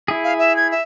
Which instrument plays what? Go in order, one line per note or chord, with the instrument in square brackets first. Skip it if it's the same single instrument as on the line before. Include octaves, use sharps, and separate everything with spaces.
[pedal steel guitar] E4 G#4
[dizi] F5
E5
G#6
E5